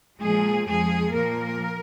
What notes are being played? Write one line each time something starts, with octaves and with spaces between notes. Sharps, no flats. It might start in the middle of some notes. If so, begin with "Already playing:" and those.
A#2 F3 G#3 G#4
F2 F3 G#3 G#4
A#2 F3 A#3 A#4